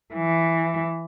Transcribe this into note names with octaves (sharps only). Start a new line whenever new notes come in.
E3